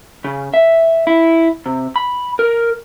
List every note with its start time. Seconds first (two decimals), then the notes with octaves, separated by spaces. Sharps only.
0.24 C#3
0.54 E5
1.07 E4
1.66 C3
1.96 B5
2.39 A#4